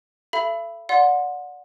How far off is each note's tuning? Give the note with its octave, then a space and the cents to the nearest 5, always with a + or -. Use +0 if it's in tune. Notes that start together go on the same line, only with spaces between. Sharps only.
A4 -5 E5 +40 B5 +0
D5 -15 F#5 -25 C6 +0